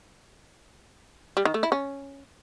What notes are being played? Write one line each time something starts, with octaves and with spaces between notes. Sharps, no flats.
G3
D#3
A3
E4
C#4